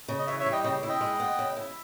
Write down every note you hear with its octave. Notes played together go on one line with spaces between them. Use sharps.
C#3
D#5
E3 C#5 E5
C#5 E5
G3
D#5 G5
C#3 D#5 G5
E4
D#5 G5
G#3
B3
C#3
E4